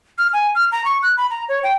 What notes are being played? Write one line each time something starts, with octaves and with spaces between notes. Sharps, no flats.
F6
G#5
F6
A#5
C#6
F#6
B5
A#5
C#5
G5